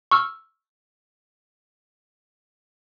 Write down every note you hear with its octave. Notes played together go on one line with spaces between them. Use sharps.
C#6 E6 F6